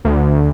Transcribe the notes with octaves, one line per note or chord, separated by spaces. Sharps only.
D2